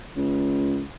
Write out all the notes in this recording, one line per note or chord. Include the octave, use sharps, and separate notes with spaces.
C#2